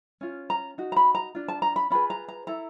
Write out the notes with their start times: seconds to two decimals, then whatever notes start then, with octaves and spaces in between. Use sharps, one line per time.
0.21 C#4 F4
0.50 A#5
0.78 D#4 F#4
0.92 A#5
0.96 B5
1.15 A#5
1.35 D4 F4
1.48 A5
1.62 A#5
1.76 B5
1.90 C#4 F4 G#4 B4 B5
2.10 A#5
2.28 A#5
2.47 E4 A4 A#5